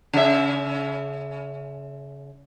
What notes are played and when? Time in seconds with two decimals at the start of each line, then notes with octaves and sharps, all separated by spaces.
0.13 C#3 E5